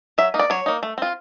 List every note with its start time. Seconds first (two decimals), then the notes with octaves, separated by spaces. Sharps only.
0.18 F#3 E5
0.34 A#3 D#4
0.39 D5
0.50 F#3 C#5
0.66 A#3 D#4
0.83 A3
0.98 C4 F4